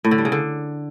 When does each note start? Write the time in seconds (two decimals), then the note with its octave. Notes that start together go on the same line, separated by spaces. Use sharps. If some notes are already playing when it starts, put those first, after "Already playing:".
0.04 A2
0.11 D3
0.18 G3
0.25 C#3
0.32 D3